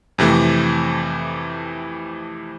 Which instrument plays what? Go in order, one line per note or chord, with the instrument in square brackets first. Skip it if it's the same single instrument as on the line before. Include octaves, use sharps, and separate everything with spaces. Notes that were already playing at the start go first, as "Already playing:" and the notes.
[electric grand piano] F2 C3 E3 A3